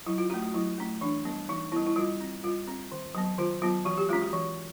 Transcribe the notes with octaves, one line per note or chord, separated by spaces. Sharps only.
F#3 E4
F4
A3 C#4 F#4
F#4
F#3 E4
A3 C#4
E3 D4
G3 B3
E3 D#4
G3 B3 E4
E4
G3 F4
C4
G3 F4
C4
D#3
F#3 B3
D#3 F4
F#3 B3 F4
E3 F#4
G4
G#3 C#4 F4
F#4
E3